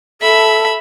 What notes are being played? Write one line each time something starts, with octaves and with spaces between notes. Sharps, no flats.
A4 E5 B5